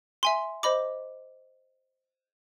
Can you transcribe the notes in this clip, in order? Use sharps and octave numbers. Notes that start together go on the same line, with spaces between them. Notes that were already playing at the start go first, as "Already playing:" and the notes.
E5 G#5 C6
C5 D#5 B5 D6